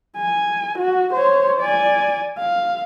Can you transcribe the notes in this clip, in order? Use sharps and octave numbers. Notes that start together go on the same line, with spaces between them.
G#5
F#4
C5 C#5
D5 G#5
F5